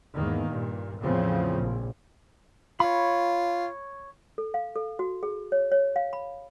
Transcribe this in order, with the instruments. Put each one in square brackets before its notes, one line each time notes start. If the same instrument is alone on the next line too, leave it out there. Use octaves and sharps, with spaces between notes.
[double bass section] E2 G#2 D#3 A#3
G2 A#2
E2 A2 C#3 F3 C4
A#1
[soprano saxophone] F4 [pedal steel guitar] C#5 B5
[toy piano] A4
F5
A4
F#4
G#4
C#5
C#5
F5
B5